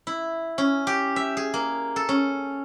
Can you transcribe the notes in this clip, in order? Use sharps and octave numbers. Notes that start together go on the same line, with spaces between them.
E4
C#4
G4
E5
G#4
A#3
A4
C#4